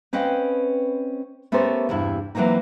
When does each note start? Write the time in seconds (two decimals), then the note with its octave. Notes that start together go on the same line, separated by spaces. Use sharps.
0.13 C4 C#4 B4 D#5 F5 G5
1.52 A3 B3 C#4 G4 A#4 C5
1.89 E2 G2 C3 E4
2.35 E3 F#3 A3 A#3 C4 D#4